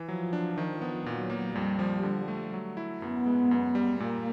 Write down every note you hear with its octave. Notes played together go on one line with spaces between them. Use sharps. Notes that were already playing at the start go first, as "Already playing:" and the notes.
Already playing: E3
F3 F#3
D4
D#3
B3
A#2 F#3
A#3
F2 G3
F3
D3
A3
F#3
E4
F#2 B3
G#3
F#2
G3
A#2 A#3